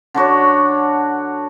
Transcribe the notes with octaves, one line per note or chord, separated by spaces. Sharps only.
D3 D4 F#4 C#5